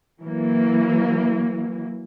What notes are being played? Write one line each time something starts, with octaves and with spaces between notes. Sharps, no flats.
E3 F#3 A#3